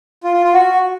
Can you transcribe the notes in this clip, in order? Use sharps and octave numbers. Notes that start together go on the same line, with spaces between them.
F4
F4
F4
F#4